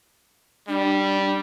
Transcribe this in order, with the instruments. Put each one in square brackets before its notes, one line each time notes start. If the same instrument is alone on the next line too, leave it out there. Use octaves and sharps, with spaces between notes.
[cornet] G3 [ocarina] D4